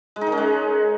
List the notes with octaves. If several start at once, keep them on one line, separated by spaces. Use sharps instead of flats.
G#3
D#4
D#3
C#4
G#3